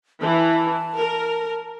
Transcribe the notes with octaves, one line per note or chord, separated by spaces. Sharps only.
E3 A5
A#4